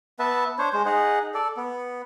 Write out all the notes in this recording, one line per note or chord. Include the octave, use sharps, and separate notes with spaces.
B3 B4 E5 A5
D4 C5 C#5
G#3 C5
D#4 G#4 F#5
A4 D5
B3